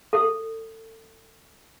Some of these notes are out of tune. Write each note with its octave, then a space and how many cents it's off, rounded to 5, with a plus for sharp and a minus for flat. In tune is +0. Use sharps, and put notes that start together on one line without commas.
A4 +30